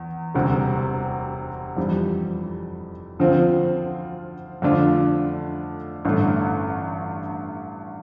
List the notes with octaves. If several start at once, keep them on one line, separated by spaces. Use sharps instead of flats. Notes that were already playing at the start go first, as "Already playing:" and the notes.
Already playing: E2
E1 D2 C3 G3
F2 E3 G3
D2 D3 F3 C4 F4
F2 D3 A3 D4 F4
A1 G2 D3 A3